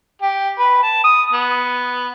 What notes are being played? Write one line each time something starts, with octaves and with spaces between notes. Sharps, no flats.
G4
B4
A5
D#6
B3